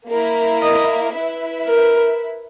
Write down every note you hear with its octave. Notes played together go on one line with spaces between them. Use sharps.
A#3 E4 A#4
D#5
E4 B4 E5
A#4